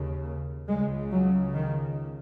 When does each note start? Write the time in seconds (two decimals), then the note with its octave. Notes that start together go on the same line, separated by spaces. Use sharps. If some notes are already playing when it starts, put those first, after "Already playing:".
Already playing: D#2 C#3
0.68 C#2 C#3 G#3
1.12 F#3
1.54 D#3